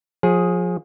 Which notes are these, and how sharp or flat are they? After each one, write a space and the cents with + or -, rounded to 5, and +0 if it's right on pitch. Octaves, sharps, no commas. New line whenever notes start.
F3 +35 G#4 +0